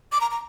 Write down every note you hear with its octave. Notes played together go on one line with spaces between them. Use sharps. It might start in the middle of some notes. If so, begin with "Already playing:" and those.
D6
A#5
A#5